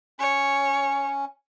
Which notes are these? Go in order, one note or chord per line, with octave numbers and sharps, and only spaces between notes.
C#4 C#5